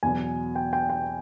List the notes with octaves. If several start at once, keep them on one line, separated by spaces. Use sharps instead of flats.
E2 B2 F#3 G#5
G5
G5
G5